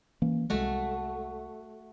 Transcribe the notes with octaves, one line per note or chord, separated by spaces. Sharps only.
E3 A#3 C#4
C2 G#3 A3 F#4